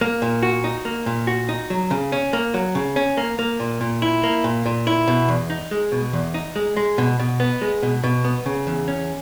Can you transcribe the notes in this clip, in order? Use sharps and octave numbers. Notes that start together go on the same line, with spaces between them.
A#3
A#2
F#4
D#4
A#3
A#2
F#4
D#4
F#3
C#3
C#4
A#3
F#3
C#3
C#4
A#3
A#3
A#2
A#2
E4
A#3
A#2
A#2
E4
B2
E2
D#4
G#3
B2
E2
D#4
G#3
G#3
B2
B2
B3
G#3
B2
B2
B3
C#3
E2
C#4